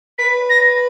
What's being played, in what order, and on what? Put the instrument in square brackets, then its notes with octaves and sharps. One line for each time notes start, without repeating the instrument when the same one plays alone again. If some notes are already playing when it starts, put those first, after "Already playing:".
[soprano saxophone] B4 [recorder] B6
[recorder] A#6